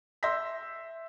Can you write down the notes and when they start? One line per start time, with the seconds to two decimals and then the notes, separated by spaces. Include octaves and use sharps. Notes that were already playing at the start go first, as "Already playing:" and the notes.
0.23 E5 C6 E6 G6 A#6 B6